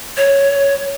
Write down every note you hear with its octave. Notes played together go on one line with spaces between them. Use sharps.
C#5